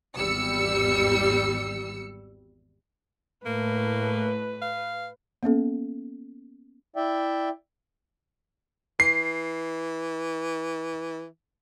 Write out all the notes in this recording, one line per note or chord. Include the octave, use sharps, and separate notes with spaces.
G#1 E2 G3 E6 C#7
A2 A#3 B4
F5
A#3 B3 C#4 A4
E4 D5 E5 G5
E3 C7